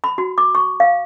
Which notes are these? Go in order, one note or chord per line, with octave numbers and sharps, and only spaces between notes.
B5
F#4
D6
C#6
F5